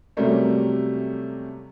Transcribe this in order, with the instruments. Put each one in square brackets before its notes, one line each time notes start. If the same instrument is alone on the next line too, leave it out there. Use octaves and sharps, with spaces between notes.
[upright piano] C3 F#3 G3 A3 A#3 C#4